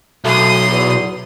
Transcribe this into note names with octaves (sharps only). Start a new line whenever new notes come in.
B1 A3 C6 D#6
E2